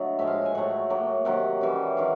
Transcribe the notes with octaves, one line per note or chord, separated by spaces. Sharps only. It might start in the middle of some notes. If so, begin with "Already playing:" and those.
Already playing: D3 F#3 A3 D#5
A2 F3 G#3 E5
F5
F#5
G#5
A2 F#3 A3 F#5
A2 F#3 A#3
C3 D#3 F#3 F#5
C#3 E3 G3
D#3 F#3 F5